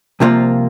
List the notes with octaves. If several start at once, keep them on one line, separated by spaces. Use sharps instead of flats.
C2 C3 F3 A#3 F4